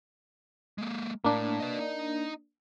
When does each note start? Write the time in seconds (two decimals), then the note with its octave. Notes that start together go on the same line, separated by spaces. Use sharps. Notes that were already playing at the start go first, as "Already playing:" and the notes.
0.78 G#3 A#3
1.24 A2 A#3 D4
1.60 B4 D#5
1.79 D#4 D#5